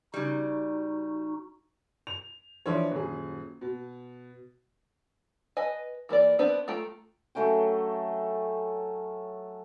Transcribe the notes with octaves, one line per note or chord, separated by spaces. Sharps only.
C#3 G3 D#4 F#4
F7
E3 F3 D4 F4 C#5
D#1 F#2 G#4
B2
B4 D#5 G#5
E3 A#3 A#4 D5
B3 C4 D4 B4 C5
A3 F4 G5 A#5
F#3 A3 C#4 G5